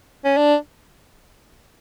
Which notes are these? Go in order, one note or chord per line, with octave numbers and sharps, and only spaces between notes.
C#4
D4